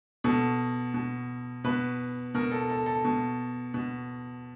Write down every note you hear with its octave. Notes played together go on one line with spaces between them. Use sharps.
B2 A4
B2
B2 B4
B2 A#4
A4
A4
A4
B2
B2